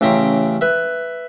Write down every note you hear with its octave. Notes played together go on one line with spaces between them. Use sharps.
A1 C#3 E5 G5 A#5 C6
B4 E5